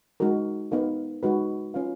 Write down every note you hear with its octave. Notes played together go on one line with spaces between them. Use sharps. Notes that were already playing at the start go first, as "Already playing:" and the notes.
G#3 D#4 F#4 A#4
B3 D#4 A#4 F5
G#3 D#4 F#4 B4
C#4 F4 B4 F5